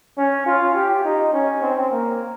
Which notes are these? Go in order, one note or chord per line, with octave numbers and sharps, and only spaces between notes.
C#4
F4
G4
D#4
C#4
C4
A#3